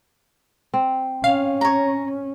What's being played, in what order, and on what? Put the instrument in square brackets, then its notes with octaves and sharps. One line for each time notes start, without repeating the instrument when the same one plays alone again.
[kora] C4
[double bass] C#4 [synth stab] F5
[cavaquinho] C#5 A#5